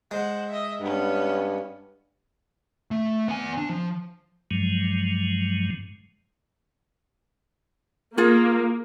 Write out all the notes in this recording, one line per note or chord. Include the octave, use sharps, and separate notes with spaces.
G#3 C5 F#5
D#5 E5
G2 B3 C#4
A3
B3 G#5
D4
F3
G2 F3 F#3 G#3
A#3 F4 G#4